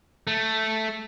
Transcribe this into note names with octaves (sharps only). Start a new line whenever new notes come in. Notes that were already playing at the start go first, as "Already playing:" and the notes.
A3